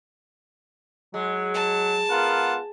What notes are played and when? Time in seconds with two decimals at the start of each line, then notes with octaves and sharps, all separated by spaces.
1.14 F#3 G#3
1.54 A5
2.10 B3 F4 A#4 F#5